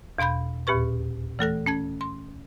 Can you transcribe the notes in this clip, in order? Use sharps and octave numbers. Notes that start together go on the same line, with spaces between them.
E2 B2 F5 B5 G6
D#2 A#2 G4 B4 C#6
E3 A3 A4 A#6
C#4 A5 G#6
C6